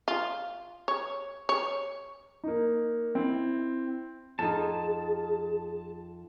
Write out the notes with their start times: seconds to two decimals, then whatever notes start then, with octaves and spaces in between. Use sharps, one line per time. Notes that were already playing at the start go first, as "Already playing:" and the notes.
0.08 F4
0.88 C#5
1.49 C#5
2.44 A#3 D#4
3.15 C4 E4
4.39 F2 D#4 G#4 A5